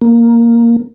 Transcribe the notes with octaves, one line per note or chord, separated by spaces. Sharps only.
A#3